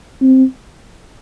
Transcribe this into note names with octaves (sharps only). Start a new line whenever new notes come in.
C4